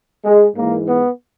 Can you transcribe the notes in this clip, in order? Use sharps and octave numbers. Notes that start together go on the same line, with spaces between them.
G#3
G#2 E3 A#3
B3